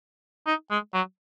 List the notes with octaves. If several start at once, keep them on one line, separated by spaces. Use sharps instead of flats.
D#4
G#3
F#3